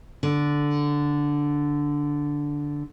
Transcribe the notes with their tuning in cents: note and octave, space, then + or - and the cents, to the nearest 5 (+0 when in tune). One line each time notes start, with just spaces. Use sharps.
D3 -5